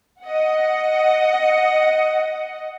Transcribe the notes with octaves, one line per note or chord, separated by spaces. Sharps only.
D#5 F#5